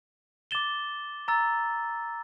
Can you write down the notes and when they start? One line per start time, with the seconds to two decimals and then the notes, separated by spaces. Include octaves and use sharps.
0.51 D6 A6 E7 G7
1.28 A#5 E6 A6